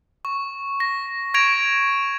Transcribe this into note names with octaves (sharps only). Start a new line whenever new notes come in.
C#6
A#6
C#6 G#6 A#6 D7 F7